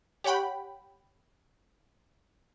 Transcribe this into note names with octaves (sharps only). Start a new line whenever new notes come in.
G4 C#5 F#5 G5 B5